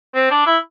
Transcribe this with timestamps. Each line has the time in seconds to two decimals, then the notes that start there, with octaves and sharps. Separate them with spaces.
0.15 C4
0.31 D4
0.47 E4